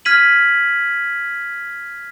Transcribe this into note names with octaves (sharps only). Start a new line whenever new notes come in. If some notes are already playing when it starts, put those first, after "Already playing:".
F6 G#6 B6 D#7 F#7